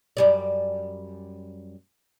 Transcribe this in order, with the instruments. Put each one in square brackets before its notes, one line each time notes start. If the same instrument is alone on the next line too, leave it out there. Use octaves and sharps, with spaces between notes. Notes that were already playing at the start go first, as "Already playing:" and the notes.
[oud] F#2 G3 D5